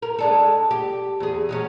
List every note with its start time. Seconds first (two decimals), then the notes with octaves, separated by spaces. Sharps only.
0.02 A#4
0.18 G#3 D4 A4
0.71 G4
1.20 E2 G#4
1.49 F#3 G#3 C#4